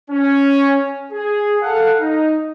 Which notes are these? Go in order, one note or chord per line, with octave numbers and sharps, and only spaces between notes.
C#4
G#4
A4 F5 F#5
D#4